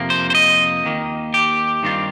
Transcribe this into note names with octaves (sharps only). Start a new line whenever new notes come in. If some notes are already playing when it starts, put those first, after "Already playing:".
Already playing: F2 C3 F3 A#3
C5
C5
D#5
D#2 D#3 A#3
G4
G2 D#3 C4 F4